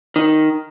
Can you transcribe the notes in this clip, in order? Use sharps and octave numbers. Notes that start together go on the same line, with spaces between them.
D#3